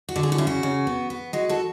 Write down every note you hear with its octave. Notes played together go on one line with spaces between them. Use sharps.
F#4
D3
G#4
F#4
C#3 E4
F#4
C#3
B3
B3
G#3 F#4
F#4 A4